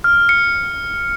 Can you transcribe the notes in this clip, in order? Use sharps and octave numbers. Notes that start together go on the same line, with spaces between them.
F6
C#7